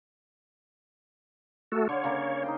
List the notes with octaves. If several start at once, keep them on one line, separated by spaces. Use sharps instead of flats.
A3 F#4 A4
D3 C#5 F5
C#3 A#3
D#4 C5 G5